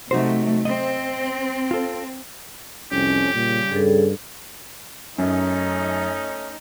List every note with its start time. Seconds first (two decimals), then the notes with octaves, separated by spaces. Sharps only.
0.11 C3 F#3 A3 D#4 F#4 C5
0.65 C4 D#5
1.71 F4 A4
2.92 C2 F2 C#4 G4
3.34 A#2 C#3 G3
3.72 G2 G#4 A4
5.18 F#2 A3 C#4 D#4